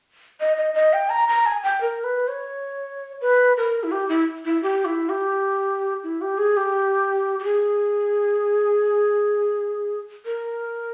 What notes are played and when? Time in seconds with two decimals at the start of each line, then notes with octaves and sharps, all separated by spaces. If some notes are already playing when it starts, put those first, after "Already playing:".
0.40 D#5
0.57 D#5
0.74 D#5
0.93 G5
1.10 A#5
1.28 A#5
1.46 G#5
1.63 G5
1.81 A#4
2.04 B4
2.28 C#5
3.21 B4
3.57 A#4
3.83 E4
3.92 G4
4.09 E4
4.45 E4
4.63 G4
4.85 E4
5.09 G4
6.03 E4
6.21 G4
6.38 G#4
6.57 G4
7.39 G4
7.44 G#4
10.25 A#4